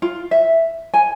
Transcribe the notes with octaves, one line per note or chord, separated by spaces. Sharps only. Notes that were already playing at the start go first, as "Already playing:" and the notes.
F4
E5
G#5